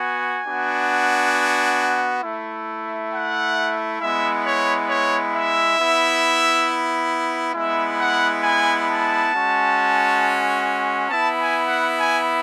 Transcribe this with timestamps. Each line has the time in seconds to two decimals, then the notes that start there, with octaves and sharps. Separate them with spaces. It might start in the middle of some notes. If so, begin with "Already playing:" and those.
Already playing: B3 F#4 G#5
0.45 B3 D4 F#4
2.22 A3 E4
3.12 F#5
4.00 G#3 B3 E4 E5
4.44 C#5
4.88 C#5
5.33 E5
5.77 B3 E4
7.54 G#3 B3 E4 E5
7.99 F#5
8.43 G#5
8.87 A5
9.31 G#3 C#4 F#4
11.08 B3 E4 A5
11.38 G#5
11.68 F#5
11.97 G#5